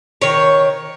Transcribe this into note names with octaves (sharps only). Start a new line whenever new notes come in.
D#3 C#5